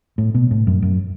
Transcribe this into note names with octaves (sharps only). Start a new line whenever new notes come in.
A2
B2
A2
F#2
F#2